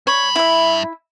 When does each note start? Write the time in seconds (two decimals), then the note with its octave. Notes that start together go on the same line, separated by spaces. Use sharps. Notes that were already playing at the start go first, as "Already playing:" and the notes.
0.07 G2 C#5 B5
0.36 E4 E5